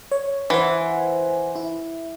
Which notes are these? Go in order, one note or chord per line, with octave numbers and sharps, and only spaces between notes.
C#5
E3 C5 F#5 G#5
E4